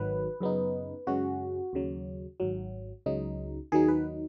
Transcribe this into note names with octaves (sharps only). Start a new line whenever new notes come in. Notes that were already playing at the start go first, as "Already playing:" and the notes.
Already playing: G#1 G#2 D#3 F#3 B4
F#2 C#3 B3 D#4
F#2 C#3 G#3 C#4 F#4
D#2 C#3 F#3
G#1 G#2 F#3
C#2 C#3 F#3 D#4
D#2 D#3 F#3 D#4 G#4
B4